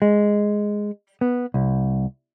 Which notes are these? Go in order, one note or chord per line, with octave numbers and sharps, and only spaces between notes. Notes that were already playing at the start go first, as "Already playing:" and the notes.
G#3
B3
C2